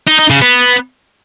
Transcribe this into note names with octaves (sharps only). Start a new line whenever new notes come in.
D#4
D#4
C#3
B3